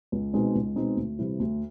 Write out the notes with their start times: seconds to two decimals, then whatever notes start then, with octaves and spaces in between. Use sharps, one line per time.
0.12 C#2
0.33 B2 G#3 C4 D#4
0.55 C#2
0.76 B2 G#3 C4 D#4
0.97 D2
1.19 C3 E3 G3 C4
1.39 D2